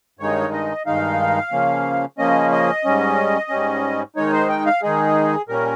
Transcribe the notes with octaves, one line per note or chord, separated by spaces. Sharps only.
G2 D#3 G#3 D#4 C#5
D#5
G2 D#3 G#3 D#4 F5
C#3 F3 A#3 C#4
C#3 F3 A#3 C#4 D#5
D#5
G#2 G3 C#4
G#2 G3 C#4
D#3 G#3 D#4 C#5
C5
G5
F5
D#3 G#3 D#4 G#4
A#2 G3 C#4 A#4